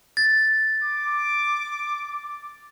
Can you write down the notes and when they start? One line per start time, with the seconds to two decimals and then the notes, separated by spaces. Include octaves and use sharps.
0.17 A6
0.83 D6